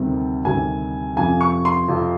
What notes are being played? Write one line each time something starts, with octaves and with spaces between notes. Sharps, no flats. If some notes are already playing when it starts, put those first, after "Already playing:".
Already playing: D2 C3 D#3 G3 C4
D2 C3 D#3 G3 C4 G#5
F2 C3 F3 G#5
C#6
C6
F2 C3 F3